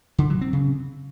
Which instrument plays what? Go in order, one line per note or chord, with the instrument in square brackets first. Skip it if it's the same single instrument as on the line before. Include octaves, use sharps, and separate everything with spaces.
[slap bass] D3
F#3
C4
C#3